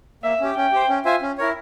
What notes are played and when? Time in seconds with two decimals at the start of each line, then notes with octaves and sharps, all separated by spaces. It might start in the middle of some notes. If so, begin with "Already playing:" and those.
0.23 A#3 E5
0.40 C#4 G4
0.56 C#4 G5
0.72 G4 C5
0.89 C#4
1.05 F4 C5 E5 G#5
1.22 C#4
1.38 E4 A#4 C#5